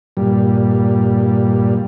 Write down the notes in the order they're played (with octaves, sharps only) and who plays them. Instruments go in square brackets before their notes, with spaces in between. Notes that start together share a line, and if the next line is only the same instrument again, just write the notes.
[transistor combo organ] G2 A#2 G3